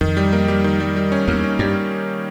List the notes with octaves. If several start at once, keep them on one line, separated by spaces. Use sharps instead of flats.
F2 D#3
G3
A#3
G3
D#3
G3
G3
C#4
E2 A#3
C#4
G2 G3